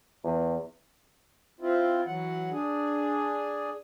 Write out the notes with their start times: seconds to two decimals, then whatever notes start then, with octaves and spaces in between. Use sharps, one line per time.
0.24 E2
1.60 C4 E4 F4
2.06 E3 F#3 F#5
2.51 D4 G#4